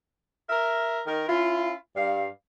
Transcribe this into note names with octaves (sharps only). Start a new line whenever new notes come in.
A#4 E5
D#3 A#4
C#4 E4 F4
G2 F5